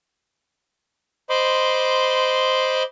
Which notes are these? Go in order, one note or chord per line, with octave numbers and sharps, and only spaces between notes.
C5 D#5 B5 C6 D6